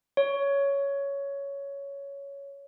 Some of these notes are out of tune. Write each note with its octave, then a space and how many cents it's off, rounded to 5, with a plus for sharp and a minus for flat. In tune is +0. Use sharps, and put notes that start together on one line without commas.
C#5 +10